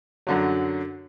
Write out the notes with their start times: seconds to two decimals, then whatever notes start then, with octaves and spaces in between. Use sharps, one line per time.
0.27 F#2 D3 F#3